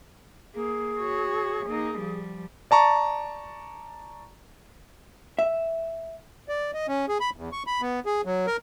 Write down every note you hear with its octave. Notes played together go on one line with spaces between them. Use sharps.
A#3 G#4
F#4 C#5
A#3 D#4
F3 G3
D5 A5 A#5 C#6
E5
D5
D#5
C#4
G#4
B5
E2
C#6
B5
B3
G#4
F#3
A#4